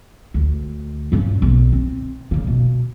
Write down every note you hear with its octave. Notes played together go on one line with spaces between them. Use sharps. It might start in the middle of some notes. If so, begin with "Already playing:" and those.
D2
G2 C#4
B1
C4
C#3 A#3
B2